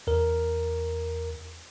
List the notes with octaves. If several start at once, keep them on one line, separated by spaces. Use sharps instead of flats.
E2 A#4